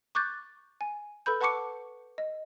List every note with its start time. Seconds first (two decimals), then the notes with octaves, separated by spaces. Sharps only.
0.15 C#6 D6 F#6 G6 A6
0.81 G#5
1.26 A4 B4 B5 G6
1.41 B4 F#5 A5 C#6 D6 C#7
2.18 D#5